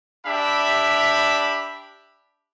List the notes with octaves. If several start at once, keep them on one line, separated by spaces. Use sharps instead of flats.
D4 G4 E5 B5